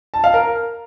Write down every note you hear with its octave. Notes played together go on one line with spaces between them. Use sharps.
A5
F5
A#4